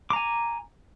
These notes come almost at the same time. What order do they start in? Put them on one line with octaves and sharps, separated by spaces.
D6 A#5 G#5